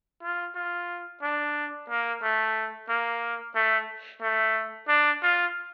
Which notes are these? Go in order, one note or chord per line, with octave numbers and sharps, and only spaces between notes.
F4
F4
D4
A#3
A3
A#3
A3
A3
D4
F4